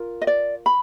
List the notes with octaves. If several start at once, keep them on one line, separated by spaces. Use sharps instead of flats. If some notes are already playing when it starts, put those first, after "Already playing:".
Already playing: F4 A#4
D#5
D5
B5